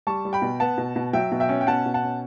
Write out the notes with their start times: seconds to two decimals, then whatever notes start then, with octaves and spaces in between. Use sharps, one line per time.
0.07 G3 A5 C#6
0.25 G3
0.33 G5 B5
0.42 B2
0.60 B3 F#5 A5
0.78 B2
0.96 B2
1.13 F#3 E5 G5
1.32 B2
1.40 E5 G5
1.49 C#4
1.61 G5
1.67 B2 F#5 A5
1.86 B2
1.94 F#5 A5
2.03 C#4